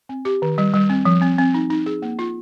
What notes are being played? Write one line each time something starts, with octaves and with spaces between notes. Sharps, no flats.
C4
G4
D#3
G3
G3
C4
F3
C4
C4
D#4
D#4
G#4
A#3
F4